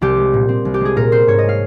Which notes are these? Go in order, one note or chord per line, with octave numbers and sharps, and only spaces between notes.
C2 G4
G#3
A#2
C4
C2
G4
G#3 G#4
A#2 A#4
C4 C5
G#2 C#5
D#5
G#3
F5